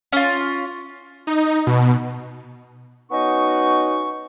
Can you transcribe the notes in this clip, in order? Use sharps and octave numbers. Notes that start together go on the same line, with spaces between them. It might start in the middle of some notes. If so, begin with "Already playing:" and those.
C#4 F4
D#4
B2
B3 C#4 D#4 F#4 D#5 C#6